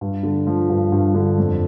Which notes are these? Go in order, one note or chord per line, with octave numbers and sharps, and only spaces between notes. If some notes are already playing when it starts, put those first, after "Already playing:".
G2
D3
F3
G2
G2
D3
F2